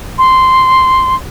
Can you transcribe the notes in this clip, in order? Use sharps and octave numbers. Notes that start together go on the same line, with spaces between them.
C6